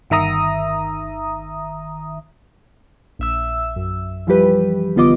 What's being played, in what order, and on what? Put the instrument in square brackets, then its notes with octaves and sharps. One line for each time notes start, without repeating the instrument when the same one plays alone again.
[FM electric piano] G1 D#3 E5 A#5 D#6
[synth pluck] A#1 E5 E6
F#2
E3 F3 G3 G4 B4
A1 D3 B3 F4 D#5 D6